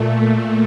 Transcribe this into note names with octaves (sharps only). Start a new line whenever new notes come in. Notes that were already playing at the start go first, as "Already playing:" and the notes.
Already playing: A#2 A3